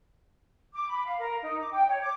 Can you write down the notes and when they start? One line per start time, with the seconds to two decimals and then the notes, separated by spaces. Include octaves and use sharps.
0.74 D6
0.90 B5
1.06 F5
1.19 A#4
1.43 D#4
1.58 D6
1.72 G5
1.88 C#5
2.01 D6